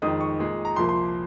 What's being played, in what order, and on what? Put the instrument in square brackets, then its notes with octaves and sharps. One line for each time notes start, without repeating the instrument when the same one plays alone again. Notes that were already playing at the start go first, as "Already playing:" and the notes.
[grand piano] F2 D#3 G#3 D#6
C#6
A#2 G#3
A#5
C2 A#2 F3 A#3 C6
C6